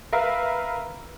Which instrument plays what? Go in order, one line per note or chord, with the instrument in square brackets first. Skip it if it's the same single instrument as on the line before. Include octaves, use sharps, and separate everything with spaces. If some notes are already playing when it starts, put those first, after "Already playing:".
[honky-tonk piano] A#4 B4 E5 F5